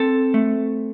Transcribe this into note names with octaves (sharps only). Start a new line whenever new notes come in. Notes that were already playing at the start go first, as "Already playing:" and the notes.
Already playing: C4 A4
A3